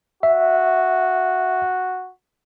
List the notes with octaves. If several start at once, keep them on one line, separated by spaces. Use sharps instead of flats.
F#4 E5